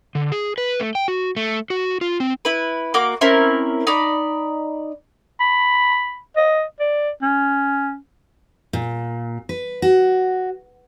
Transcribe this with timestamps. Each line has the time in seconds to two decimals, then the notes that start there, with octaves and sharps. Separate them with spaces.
0.15 D3
0.32 G#4
0.58 B4
0.80 A3
0.95 G5
1.08 F#4
1.37 A3
1.70 F#4
2.01 F4
2.20 C4
2.45 E4 B4
2.94 A#3 F#4 D6
3.21 C4 C#4 E4 A#4
3.87 D#4 D5 B5
5.40 B5
6.37 D#5
6.80 D5
7.22 C#4
8.73 A#2
9.49 B4
9.82 F#4